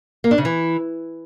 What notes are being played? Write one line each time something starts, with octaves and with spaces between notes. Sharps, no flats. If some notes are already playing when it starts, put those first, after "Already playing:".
A#3
D4
C#3
E3